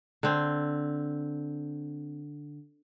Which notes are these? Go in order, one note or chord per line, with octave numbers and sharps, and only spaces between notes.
D3 C4